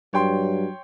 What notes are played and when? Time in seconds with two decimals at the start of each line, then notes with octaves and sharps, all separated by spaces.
0.14 G2 F#3 C#5 G5 C6